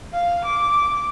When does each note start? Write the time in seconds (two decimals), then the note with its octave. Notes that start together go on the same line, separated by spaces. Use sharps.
0.13 F5
0.44 D6